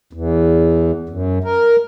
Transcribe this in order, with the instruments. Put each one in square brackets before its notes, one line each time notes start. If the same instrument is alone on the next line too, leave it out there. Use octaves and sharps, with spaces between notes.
[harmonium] E2
F#2
A#4